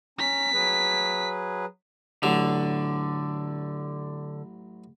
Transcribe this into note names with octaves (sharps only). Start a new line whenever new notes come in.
C#4 A#5 B6
F#3 G#4 B4
A1 D3 F#3